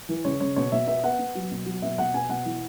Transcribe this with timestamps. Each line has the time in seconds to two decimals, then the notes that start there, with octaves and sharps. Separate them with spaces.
0.09 E3
0.25 C#3 C#5
0.40 C#3 C#5
0.56 B2 C#5
0.72 B2 E5
0.87 B3 E5
1.03 B3 F#5
1.19 B3
1.35 F#3
1.51 B2
1.66 F#3
1.82 B2 E5
1.98 B2 F#5
2.14 B2 G#5
2.29 B2 F#5
2.45 E3